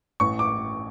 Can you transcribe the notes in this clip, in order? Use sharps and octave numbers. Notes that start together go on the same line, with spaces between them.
A1 C#6
D6